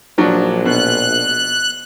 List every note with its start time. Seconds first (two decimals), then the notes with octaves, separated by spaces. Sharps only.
0.18 A#1 F3 F#3 D4
0.65 B2 F#6